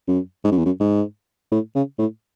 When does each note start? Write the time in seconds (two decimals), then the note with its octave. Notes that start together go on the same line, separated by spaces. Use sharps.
0.08 F#2
0.44 G#2
0.51 F#2
0.58 E2
0.66 F#2
0.80 G#2
1.52 A2
1.75 C#3
1.98 A2